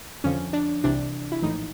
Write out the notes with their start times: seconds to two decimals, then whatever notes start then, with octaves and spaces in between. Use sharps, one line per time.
0.24 F2 D3 F3 C#4
0.53 D4
0.84 C2 C3 E3 D4
1.32 E4
1.42 A#1 A2 E3 D#4